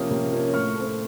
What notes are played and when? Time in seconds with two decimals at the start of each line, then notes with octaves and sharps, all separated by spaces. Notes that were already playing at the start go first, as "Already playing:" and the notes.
Already playing: C3 F3 A#3 C#4 D#6
0.11 C3
0.32 F3 A#3 C#4
0.54 A2 C#6 F6
0.75 A3 C4